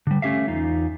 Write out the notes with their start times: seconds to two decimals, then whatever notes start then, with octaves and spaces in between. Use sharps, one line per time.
0.07 D3 G3
0.22 A3 C#4 G4 E5 F5
0.48 E2 D#4 F4